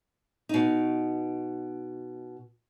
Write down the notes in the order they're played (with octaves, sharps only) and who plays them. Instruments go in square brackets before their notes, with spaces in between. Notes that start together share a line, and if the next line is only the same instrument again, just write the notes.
[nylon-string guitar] B2 D#4